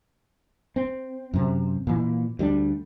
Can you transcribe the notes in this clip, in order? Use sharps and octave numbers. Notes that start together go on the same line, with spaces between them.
C4
F#2 C3
A#2 E3
D2 G3 C4 D4